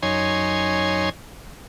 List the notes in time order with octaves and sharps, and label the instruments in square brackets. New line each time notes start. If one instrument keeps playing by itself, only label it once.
[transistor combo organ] F#2 D#4 C#5 G#5 C6